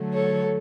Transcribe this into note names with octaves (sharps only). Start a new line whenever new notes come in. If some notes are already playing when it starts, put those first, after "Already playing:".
Already playing: D3 F#3 A3
A4 C#5